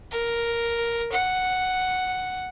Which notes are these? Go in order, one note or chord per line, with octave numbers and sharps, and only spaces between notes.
A#4
F#5